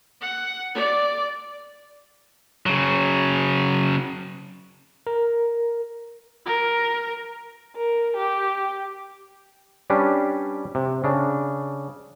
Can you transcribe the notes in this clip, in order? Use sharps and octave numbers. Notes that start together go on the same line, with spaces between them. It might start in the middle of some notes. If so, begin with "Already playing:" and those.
F#5
D5
C#3 F#3
A#4
A#4
A#4
G4
G3 C#4 D4 G4 B4
C3
C#3 D4